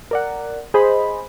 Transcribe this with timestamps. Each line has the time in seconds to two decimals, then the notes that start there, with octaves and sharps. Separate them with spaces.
0.11 A#4 D5 F#5
0.74 G#4 C5 D#5 B5